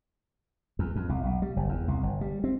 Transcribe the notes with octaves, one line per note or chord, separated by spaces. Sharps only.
E2
F2
C2
B1
G3
F#1
E2
C2
G1
G3
C4